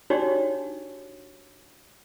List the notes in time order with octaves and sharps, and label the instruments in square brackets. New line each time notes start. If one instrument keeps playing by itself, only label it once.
[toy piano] D4 D#4 F#4 G4 C#5 D5